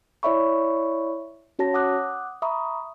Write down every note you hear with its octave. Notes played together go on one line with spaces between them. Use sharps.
E4 C#5 D5 E5 B5 C#6
C#4 F#4 C#5 A5 A#6
F#5 D6 D#6 F#6
E5 A#5 B5 C#6 D#6